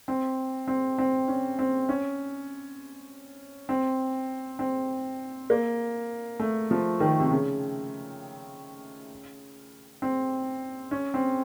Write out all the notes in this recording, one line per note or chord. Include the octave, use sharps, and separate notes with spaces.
C4
C4
C4
C#4
C4
C#4
C4
C4
A#3
A3
F3
D#3
C3
C#3
C4
C#4
C4